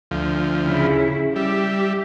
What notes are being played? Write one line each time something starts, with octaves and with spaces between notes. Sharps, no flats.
D2 F3
C#3 E4
G3 G4 E5